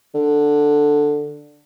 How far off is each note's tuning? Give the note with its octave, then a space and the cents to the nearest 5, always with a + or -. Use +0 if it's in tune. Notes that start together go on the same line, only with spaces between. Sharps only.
D3 +5